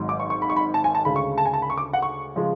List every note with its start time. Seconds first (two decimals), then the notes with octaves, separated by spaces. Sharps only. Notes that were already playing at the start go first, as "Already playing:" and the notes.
Already playing: G#1 G#2 F#3
0.09 D6
0.20 C#6
0.30 C#6
0.42 B5
0.50 C#6
0.56 B5
0.74 A5
0.84 G#5
0.95 A5
1.05 D2 C#3 G#3 B5
1.16 C#6
1.38 A5
1.45 G#5
1.54 A5
1.62 B5
1.70 C#6
1.78 D6
1.93 F#5
2.02 C#6
2.36 C#3 F3 G#3